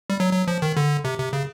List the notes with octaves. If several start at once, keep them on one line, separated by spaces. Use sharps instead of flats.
G3
F#3
F#3
F3
D#3
D3
C3
C3
C#3